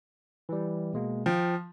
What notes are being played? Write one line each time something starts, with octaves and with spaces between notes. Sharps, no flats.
E3 G3
B2 G#3 A#3
F3 G5